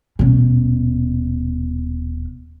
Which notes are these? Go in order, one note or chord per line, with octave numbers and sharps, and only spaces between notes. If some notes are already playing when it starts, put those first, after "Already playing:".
D#1 B2